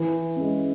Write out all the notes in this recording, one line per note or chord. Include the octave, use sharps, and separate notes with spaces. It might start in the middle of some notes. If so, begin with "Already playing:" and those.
Already playing: E3
G#3 C#4